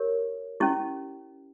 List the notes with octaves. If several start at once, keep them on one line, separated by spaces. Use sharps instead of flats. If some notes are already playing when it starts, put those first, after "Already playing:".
Already playing: G4 A#4 C#5
C#4 E4 G4